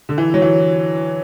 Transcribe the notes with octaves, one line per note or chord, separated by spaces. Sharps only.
D3
E3
F#3
E3